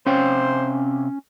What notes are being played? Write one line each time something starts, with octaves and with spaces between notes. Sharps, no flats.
C3 C#4 C5 F5 G5